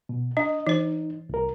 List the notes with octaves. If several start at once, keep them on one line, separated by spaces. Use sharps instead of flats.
B2
D4 D#5
E3 D#4 C5
C2 A#4